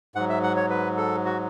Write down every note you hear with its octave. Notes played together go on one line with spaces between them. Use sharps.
G#2 F#3 F#5
E5
F#5
C#5
B4
A4
F#4